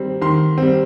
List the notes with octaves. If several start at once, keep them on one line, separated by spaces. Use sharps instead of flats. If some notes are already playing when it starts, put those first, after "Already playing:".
Already playing: D#3 G3 C4
D#3 C6
G3 C4